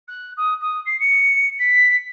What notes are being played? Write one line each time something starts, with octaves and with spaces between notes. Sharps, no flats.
F#6
D#6
D#6
C7
C#7
B6